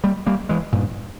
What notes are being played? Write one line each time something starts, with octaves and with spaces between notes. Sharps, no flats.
G3 A#3
G3 A#3
E3 G#3
G2 A#2